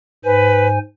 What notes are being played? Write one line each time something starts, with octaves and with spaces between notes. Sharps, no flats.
G#2 B4 C5 G#5